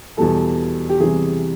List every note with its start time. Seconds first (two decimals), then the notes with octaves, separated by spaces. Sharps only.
0.17 E2 B2 G3 A4
0.89 G4
1.00 E2 C3 E3 G3 G#4